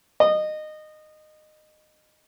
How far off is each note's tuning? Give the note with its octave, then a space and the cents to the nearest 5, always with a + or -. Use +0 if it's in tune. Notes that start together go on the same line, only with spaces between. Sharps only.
D#5 -20